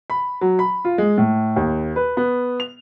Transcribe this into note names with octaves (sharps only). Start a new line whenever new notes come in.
B5
F#3
B5
F4
G#3
A2
D#2
B4
B3
F7